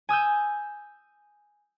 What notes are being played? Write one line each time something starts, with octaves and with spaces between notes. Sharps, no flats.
G#5 D#6 E6 G6